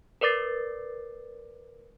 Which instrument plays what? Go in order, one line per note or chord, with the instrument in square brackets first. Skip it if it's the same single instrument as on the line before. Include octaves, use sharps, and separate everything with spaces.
[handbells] A#4 B4 D5 D6 A6 C7